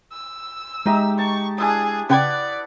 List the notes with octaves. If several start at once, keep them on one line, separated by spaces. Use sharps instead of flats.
E6
G#3 D#4 G4 D#5 E5 A#5
A5 C#6
D4 E4 G#4 D#6
C#3 B4 D5 F#5 G5 G#6